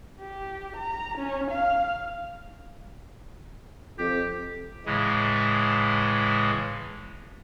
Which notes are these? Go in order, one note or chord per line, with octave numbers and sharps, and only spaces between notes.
G4
A#5
C#4
F5
F2 G4
A2 C#3 E3 G#3